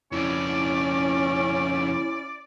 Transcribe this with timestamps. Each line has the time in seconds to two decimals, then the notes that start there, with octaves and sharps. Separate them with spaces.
0.12 F2 C#3 C#4 E4 D5